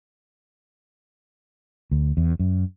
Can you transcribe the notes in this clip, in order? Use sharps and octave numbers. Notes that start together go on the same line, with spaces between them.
D2
E2
F#2